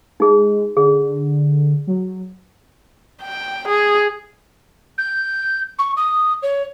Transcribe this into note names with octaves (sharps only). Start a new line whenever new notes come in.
G#3 D#4 G#4
D3 G#4
F#3
G5
G#4
G6
C#6
D#6
C#5